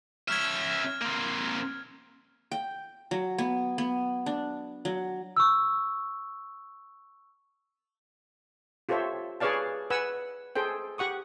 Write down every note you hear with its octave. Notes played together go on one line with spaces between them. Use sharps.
C#4 E5 F6 G#6
A#3 C4
G5
F#3
B3
B3
D4
F#3
C#6 E6
F4 G4 A4 C5 C#5 E5
G#4 B4 C#5 D5 F5 A5
B4 F#5 G#5 E6
G#4 A4 C5 G5
G4 F#5 C#6 D#6